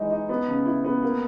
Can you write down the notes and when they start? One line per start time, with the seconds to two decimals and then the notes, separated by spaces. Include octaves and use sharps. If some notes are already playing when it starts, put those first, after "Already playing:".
Already playing: E3 G#3 D#4
0.11 D#4
0.29 B3
0.47 C#3
0.66 E4
0.84 B3
1.03 A#3